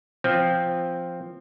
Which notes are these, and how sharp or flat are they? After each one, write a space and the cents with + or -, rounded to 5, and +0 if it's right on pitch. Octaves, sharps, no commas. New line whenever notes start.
F3 +0 C4 +0